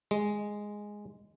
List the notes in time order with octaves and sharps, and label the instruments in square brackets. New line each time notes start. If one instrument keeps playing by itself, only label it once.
[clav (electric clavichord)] G#3